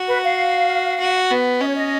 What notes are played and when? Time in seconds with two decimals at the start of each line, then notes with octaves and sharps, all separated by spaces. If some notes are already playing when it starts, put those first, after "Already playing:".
Already playing: F#4
0.08 B4
0.24 F5
1.00 F#4
1.30 B3
1.61 C#4 D#5
1.67 C#5
1.75 D#5